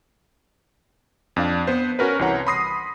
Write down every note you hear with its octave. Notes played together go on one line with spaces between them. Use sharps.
F2 D4 F5
B3 B4 C5
C#4 F#4 A#4 B4
C2 E3 C#5 F#5 A#5
B5 C6 D#6 A#6 C7